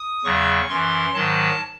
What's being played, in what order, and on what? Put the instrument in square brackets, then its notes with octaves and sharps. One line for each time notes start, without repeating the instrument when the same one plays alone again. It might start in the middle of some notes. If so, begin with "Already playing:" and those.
Already playing: [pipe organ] D#6
E2 C#3 F#3 C#6
F#2 E3 C6
G#2 D#3 F#3 A5